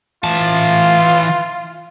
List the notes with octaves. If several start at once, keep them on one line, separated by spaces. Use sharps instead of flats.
E3 F4 A5